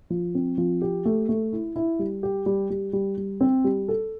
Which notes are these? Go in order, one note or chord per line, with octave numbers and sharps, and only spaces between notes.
F3
C4
F3
G4
A3
A3
E4
E4
G3
G4
G3
G3
G3
G3
C4
G3
A4